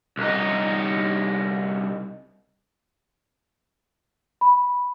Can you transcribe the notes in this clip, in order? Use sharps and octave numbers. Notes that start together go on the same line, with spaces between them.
C2 D#4
B5